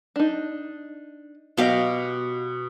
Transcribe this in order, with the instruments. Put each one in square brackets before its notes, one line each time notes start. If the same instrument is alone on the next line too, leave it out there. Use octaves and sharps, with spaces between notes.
[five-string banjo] D4 D#4
[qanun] B2 F5 D6 [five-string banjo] F#3 G4 D#5